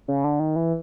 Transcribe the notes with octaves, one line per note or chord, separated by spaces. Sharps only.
C#3
D3
D#3
E3